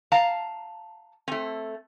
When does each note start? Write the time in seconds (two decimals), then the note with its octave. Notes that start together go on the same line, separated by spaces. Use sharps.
0.12 F5 A5 A#5
1.28 A3 C4